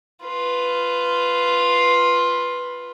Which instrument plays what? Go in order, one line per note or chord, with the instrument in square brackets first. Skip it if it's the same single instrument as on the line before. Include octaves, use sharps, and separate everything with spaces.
[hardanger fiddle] F4 B4